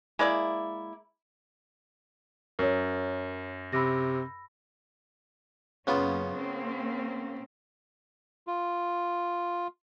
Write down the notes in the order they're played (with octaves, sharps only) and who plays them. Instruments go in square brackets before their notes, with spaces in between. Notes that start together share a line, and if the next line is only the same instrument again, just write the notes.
[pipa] G#3 A#3 E4 D5
[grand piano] F#2 [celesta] A#4 C#5
[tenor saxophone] C3 [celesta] B5 E6 A#6
[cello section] F#2 A#3 C#4 [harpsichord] C#3 B3 F4
[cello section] A#3 C4 C#4
[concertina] F4